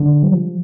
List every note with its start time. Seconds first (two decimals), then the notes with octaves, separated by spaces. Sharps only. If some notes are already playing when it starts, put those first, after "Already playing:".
Already playing: D3
0.23 G3
0.31 F3